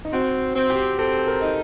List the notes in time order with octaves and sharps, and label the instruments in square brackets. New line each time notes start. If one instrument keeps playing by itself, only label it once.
[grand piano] D#4
[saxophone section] C4 [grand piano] F#4
[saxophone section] C4
[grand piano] G4
[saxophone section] C4 [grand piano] A4
[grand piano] A#4
[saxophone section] D#4